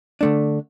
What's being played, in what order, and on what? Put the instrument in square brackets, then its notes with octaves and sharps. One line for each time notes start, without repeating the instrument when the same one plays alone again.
[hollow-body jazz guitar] D3 A3 D4